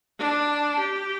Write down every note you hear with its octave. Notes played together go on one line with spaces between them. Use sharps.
D4
G4